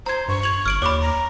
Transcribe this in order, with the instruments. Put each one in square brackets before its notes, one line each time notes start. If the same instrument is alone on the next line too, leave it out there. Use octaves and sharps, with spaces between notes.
[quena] C5 [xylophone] A#5 G#6
[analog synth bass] G2 [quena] C#6
[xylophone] G#6 F7 F#7
[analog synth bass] G1 [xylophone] F6 D7 F#7
[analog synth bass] D#2 [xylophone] C#5 B5 [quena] D6
[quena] A#5